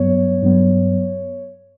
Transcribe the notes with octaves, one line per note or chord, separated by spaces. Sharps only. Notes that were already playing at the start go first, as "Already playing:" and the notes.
Already playing: G2 F#3 B3 C#5
G2 F#3 B3